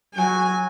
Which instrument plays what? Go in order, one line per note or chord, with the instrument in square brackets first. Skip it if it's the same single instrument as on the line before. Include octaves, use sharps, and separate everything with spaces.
[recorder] F#3 [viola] G#5